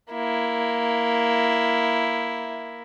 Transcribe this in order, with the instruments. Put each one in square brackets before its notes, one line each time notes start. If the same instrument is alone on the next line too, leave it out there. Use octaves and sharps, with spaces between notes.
[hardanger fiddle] A#3 E4